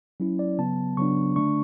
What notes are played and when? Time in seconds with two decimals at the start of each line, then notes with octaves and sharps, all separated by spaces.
0.20 F#3 C#4 E4
0.39 D5
0.58 C#3 F#3 B3 A5
0.97 C#3 F#3 B3 D4 C#6
1.36 D3 A3 D4 C#6